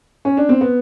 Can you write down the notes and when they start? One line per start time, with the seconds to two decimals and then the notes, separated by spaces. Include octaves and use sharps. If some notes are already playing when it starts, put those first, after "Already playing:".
0.25 C#4
0.37 D4
0.49 C4
0.61 B3